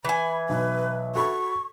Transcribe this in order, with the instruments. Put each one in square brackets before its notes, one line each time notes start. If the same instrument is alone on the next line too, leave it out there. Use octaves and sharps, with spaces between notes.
[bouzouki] E3 G#5 [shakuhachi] B5
[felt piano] B1 [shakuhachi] B4
[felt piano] F#4 A4 B5 [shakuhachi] C#6